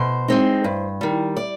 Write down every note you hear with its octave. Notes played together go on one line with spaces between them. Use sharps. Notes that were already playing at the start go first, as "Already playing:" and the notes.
Already playing: B2 C5
G#3 C4 D#4
G2
D#3 G3
D5